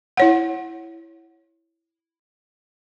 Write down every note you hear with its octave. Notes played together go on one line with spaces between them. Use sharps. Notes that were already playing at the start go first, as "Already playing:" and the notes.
E4 C#5 F#5